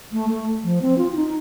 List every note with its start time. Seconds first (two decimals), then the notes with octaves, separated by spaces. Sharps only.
0.12 A3
0.30 A3
0.64 F3
0.82 C4
0.98 F4
1.12 F4
1.16 D#4